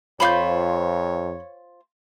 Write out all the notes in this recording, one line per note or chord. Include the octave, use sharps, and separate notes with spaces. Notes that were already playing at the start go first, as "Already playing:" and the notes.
F2 F4 C5 C#5 B5 C6 G6